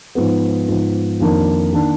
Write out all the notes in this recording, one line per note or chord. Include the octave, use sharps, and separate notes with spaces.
G#2 F3 B3
G#2 F3 B3
F2 D#3 A#3 D4
D#3 A#3 D4